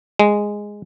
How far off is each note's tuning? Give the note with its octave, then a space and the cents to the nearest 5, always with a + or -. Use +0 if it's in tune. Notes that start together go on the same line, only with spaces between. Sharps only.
G#3 -5